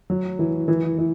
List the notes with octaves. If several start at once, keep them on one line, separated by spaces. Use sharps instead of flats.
F#3
E3
E3
E3